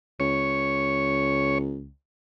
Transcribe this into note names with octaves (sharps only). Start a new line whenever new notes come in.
C#2 C#5